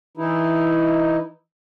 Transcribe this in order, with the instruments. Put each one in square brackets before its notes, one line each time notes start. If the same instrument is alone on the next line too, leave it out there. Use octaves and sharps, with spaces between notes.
[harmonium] E3 D#4 E4